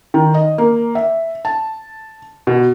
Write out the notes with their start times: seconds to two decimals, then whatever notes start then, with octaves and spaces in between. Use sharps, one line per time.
0.14 D#3
0.34 D#5
0.58 A#3
0.95 E5
1.45 A5
2.47 B2